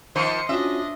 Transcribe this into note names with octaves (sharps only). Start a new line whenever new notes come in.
D#3 F3 C5 C#7
C#4 D4 F4 F#4 D#5 E5